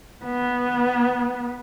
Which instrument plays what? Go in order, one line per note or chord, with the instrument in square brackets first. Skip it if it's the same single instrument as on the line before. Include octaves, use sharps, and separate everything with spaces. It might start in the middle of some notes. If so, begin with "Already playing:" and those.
[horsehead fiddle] B3